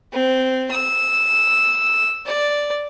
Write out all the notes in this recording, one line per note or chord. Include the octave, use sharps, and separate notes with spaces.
C4
E6
D5